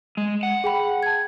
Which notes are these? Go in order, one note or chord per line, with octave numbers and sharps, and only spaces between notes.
G#3
F#5
G#4 G5 B5
A5 G#6